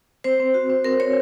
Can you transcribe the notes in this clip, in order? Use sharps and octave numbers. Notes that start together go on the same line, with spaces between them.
C4 C5
C4
F#4
C4
C4 A#4
C4 C#5